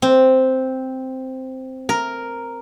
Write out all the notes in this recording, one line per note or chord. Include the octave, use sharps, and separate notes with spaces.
C4
A#4